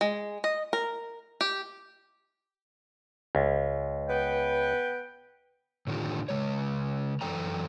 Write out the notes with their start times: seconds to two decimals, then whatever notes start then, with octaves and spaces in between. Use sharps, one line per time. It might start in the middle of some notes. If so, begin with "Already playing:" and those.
0.01 G#3
0.44 D#5
0.73 A#4
1.41 G4
3.35 C#2
4.09 B3 B4 G5
5.87 A2 D3 D#3 C#4 F4 G4
6.28 C#3 G#3 C#5
7.21 F#2 E3 A4 G5 A#5